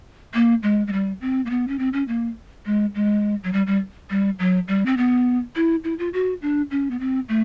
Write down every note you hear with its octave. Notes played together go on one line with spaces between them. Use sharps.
A#3
G#3
G#3
G3
C4
A#3
B3
C#4
C4
C#4
A#3
G#3
G#3
F#3
G3
G3
G3
F#3
G3
C4
B3
E4
E4
F4
F#4
D4
C#4
B3
C4
A3